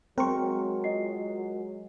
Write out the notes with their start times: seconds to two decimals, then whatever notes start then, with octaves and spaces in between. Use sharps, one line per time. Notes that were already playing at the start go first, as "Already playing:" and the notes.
0.18 F#3 G#3 C4 A#4 G5 C6 C#6
0.84 F4 D#5 C7